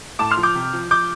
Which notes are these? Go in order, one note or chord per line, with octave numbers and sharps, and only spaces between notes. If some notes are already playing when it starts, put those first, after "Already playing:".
A2 A5 D6
C6 F6
F3
D6 G6
C3
F3
F3 D6 G6